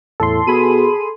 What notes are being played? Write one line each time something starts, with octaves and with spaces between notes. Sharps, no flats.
E2 A2 A4 C6
B2 G#4 B5 D#7